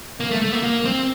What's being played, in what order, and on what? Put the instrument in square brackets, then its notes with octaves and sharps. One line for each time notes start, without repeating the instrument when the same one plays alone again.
[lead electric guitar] A#3
A3
A3
A#3
A#3
C4